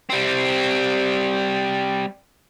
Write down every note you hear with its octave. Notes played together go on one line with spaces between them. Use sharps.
G3 C4